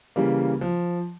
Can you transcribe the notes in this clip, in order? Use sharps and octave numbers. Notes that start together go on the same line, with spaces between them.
C#3 E3 G3 A#3
F3